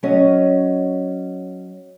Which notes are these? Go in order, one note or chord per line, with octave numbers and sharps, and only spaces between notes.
F#3 C#4 D#5